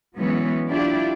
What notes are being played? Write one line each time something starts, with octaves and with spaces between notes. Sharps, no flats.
E3 F#3 G#3 B3 C#4
D4 E4 F4 G4 D5